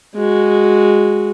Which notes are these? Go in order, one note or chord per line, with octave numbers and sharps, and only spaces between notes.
G#3 F#4